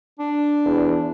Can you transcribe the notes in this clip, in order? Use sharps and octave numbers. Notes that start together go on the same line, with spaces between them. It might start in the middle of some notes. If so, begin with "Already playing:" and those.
D4
E2